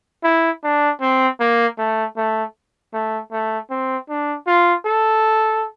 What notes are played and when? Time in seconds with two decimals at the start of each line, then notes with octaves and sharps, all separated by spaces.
0.24 E4
0.64 D4
1.01 C4
1.40 A#3
1.78 A3
2.17 A3
2.94 A3
3.32 A3
3.70 C4
4.09 D4
4.47 F4
4.85 A4